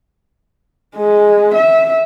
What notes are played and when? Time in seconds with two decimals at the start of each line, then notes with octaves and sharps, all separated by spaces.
0.96 G#3
1.54 E5